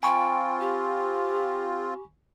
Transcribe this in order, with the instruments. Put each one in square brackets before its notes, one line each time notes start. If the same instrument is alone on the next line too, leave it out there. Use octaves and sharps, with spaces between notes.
[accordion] C4 F4 [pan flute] G5 [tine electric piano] G#5 B5 C#6
[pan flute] G4